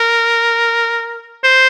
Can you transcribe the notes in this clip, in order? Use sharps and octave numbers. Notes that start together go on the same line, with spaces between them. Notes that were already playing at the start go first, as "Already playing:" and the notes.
Already playing: A#4
C5